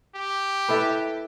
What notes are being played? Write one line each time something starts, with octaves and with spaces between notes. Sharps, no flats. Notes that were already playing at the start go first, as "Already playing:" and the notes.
G4
E4 A4 B4